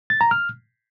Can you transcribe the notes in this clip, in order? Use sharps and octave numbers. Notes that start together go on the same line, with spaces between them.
A6
A#5
F6